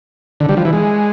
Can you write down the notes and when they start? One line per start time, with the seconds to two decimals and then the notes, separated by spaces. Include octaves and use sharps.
0.40 D3
0.49 G3
0.57 F3
0.65 E3
0.73 G#3